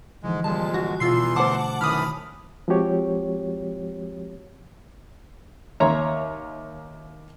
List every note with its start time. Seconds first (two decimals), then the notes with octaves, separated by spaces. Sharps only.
0.24 G#2 D3 E3 F3 G#3
0.44 F2 A#2 G3 G#3 A5
0.74 F#4
1.00 E2 B2 E3 F4 C6 E6 C7
1.36 D3 A3 C5 F#5 A5 D6
1.81 F#2 D#3 E3 B5 D#6 F6
2.68 F3 G#3 C4 F#4 G4 C#5
5.80 D#2 C#5 E5 A#5 C6